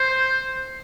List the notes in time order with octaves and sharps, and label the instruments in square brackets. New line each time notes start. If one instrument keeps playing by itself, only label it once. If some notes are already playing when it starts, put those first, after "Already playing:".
Already playing: [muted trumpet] C5